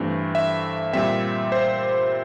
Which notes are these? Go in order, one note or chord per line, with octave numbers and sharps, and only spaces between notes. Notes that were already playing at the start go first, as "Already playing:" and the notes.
Already playing: G2 E3 A3 C4
E5
A#2 G3 C4 E5
C5